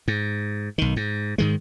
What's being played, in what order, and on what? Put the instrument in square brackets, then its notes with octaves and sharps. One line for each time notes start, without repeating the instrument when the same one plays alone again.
[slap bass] G#2
B1 D#3
G#2
G#2 D#3 G#3